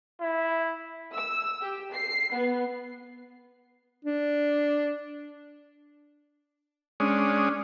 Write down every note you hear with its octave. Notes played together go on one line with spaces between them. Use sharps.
E4
E6
G4
C7
B3
D4
G#3 C#4 D4 D#6